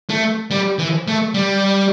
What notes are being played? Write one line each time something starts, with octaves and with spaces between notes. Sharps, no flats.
A3
G3
E3
A3
G3